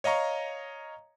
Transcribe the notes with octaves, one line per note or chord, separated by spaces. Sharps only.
C#5 D#5 F5 A#5 C#6